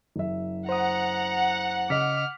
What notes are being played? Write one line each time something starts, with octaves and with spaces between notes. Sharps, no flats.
F#1 E5
C5 F#5 A#5 D#6
C#3 D#5 D6 F6 B6